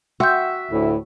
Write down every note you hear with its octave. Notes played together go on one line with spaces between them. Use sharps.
F#4 E5 G5 C6 G6
D2 A2